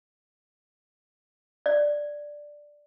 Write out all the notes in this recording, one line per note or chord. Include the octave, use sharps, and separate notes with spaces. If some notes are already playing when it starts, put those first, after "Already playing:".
D5